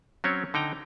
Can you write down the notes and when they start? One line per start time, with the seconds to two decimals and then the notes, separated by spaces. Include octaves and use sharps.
0.24 F#3 C4 C#4 C#5
0.54 D3 D#4 G5 A#5